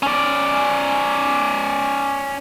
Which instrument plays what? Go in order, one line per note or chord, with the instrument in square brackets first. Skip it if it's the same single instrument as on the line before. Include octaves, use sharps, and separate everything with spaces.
[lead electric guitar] C#4 D5